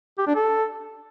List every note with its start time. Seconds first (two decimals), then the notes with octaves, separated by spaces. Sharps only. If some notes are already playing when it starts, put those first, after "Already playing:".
0.18 G4
0.27 D4
0.35 A4